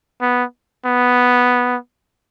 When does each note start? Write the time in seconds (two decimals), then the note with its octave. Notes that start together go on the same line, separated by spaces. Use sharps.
0.22 B3
0.86 B3